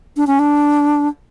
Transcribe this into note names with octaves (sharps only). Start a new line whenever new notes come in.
D4
C#4
D4